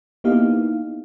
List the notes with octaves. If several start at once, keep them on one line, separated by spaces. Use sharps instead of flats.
A#3 B3 D#4 E4 G4 F5